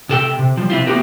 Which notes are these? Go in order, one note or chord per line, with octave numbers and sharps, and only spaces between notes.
C3 A4 G5
C3
F3 G3
C3 C4 E4 F4
A3 B3 C4 F#4 G4 A#4